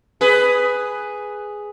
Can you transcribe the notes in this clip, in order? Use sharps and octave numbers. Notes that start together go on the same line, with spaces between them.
G#4 B4